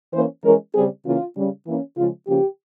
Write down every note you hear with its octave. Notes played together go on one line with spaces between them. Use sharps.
E3 A#3 C#4 C5
E3 G#3 C#4 A#4
C#3 G3 C4 G#4
C#3 E3 A#3 C#4 F4
C#3 G3 C#4
E3 A#3 C#4 E4
C#3 F3 G#3 F4
C#3 F3 A#3 C#4 G4